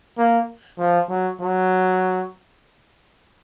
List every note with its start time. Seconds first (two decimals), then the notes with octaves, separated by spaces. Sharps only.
0.18 A#3
0.78 F3
1.09 F#3
1.40 F#3